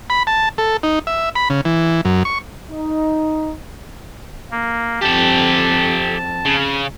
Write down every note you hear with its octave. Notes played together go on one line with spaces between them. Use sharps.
B5
A5
A4
D#4
E5
B5
C#3
E3
F#2
C#6
D#4
A#3
F2 C4 G4 A4 A5
C#3